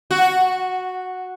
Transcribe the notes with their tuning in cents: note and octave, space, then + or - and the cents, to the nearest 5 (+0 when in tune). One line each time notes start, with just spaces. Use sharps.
F#4 -5